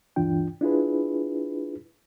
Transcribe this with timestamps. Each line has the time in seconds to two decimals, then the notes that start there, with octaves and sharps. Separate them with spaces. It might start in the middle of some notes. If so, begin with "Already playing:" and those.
0.16 D2 G2 E3 D4 F4 G5
0.61 D4 E4 F4 G#4 B4